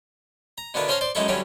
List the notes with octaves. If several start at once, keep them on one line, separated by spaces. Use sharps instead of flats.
A#5
B2 D3 A#3 B3 D4 E4
C#4 C5 C#5 F5 A5 A#5
C5 D5
F#2 G#3 D#4 E4 A4 C#6
D3 F#3 G3 C#4 D4 E4